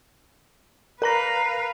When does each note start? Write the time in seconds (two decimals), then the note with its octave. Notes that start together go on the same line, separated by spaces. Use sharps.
1.02 A#4 B4 F5 A#5 A#6